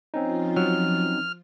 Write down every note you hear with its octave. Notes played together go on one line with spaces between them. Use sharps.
F3 C4 C#4 D#4 F4
F#3 F6